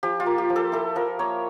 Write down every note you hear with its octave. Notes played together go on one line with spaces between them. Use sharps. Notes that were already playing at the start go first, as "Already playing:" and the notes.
F3 G4
F4
A#3
G4
F3
A4
E4 A4
F3 A#4
A#3 C#5